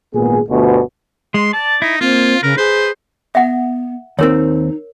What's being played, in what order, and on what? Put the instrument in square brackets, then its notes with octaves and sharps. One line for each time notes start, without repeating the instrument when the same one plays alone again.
[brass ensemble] G#1 A#2 B3 G#4
G1 D2 B2
[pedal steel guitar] G#3 [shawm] C6
[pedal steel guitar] D5 [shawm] A5
[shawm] D#4 [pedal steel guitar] E4
[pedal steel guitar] A#3 [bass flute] C4 [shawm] F4
[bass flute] C#3 [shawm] A#4 [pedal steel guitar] B4
[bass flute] G#4 [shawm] C5
[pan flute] B3 [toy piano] E5 F#5
[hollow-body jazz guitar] D#2 C4 [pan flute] D#4 [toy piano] A#4 C#5